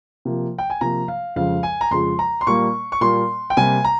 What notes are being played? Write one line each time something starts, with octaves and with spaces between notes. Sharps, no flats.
C3 F3 A#3
G5
G#5
C3 F3 A#3 A#5
F5
F2 C#3 F3 G#3 F5
G#5
A#5
F2 C#3 F3 G#3 C6
A#5
C6
A#2 G3 A#3 C#6
C#6
A#2 G3 A#3 C6
G5
C3 G3 A#3 G#5
A#5